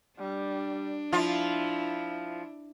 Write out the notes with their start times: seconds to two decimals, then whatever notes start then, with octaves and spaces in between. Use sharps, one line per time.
0.19 G3 D4
1.13 F3 E4 F4